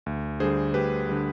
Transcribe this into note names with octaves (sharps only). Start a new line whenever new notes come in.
D2
D3 G3 G#4 C5
D2 G4 B4
D3 G3